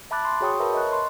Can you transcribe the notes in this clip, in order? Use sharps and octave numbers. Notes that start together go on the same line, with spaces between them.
E5 A5 B5 D6 F#6 A6
C6
F#4 G#4 C#5 G5 C#6 D#6
A#4 B4 C#5 E5 A5 B5
D#5 C#6 F#6
C6